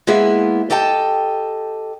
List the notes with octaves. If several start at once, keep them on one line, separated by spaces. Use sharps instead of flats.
G#3 A#3 B3 E4 G#4 E5
G4 A4 D#5 G5 A5